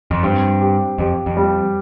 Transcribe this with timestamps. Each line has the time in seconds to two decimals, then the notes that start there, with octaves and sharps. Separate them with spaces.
0.11 F2
0.23 G2 C4
0.61 G4
0.98 F2 G4
1.26 F2
1.37 G3